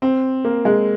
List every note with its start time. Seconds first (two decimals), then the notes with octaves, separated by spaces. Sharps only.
0.02 C4
0.45 A#3
0.65 G#3